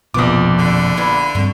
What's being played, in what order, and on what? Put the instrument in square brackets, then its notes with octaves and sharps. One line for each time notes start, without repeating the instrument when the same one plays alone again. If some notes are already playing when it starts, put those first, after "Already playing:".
[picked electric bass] F1 F2 B2 [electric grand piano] A#1 B3 D6 [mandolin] F4 D#6
[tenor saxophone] D3
[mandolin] E4 F4 B4
[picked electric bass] G2 G3 C4 [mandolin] A3